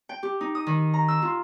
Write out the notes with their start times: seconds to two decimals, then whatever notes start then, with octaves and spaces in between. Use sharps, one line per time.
0.09 G5
0.23 G4
0.41 D#4
0.55 D#6
0.67 D#3
0.94 A#5
1.08 E6
1.22 F4